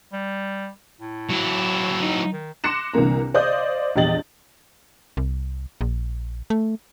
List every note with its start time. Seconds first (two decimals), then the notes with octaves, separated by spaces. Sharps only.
0.13 G3
1.00 A2
1.30 F#3 E4
2.02 D#4
2.33 D#3
2.64 C6 D6 F#6 A#6 C#7 E7
2.94 C2 D3 E3 A#3 A#5
3.34 C5 D5 D#5 F5 D#6 G6
3.95 A#1 E2 G4 D#5 A6 F#7
5.17 C2
5.81 A#1
6.50 A3